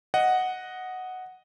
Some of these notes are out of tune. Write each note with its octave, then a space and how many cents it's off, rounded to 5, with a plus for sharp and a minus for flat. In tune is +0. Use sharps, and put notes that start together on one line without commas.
D#5 +0 F#5 +0